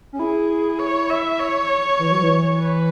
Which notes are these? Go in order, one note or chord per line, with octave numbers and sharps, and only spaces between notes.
C#4
E4 G#4
C#5
E5
C#5
E3
F#3
E3
B4